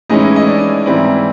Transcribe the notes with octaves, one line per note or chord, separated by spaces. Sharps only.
A2 E3 G#3 C#4 D#4 E4 D#5
D#5
D4 D5
G#2 E3 G3 C4 E4